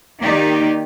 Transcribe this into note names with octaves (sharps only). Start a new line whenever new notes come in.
D#3 A#3 D#4 G4 D5